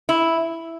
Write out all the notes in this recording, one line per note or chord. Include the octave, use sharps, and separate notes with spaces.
E4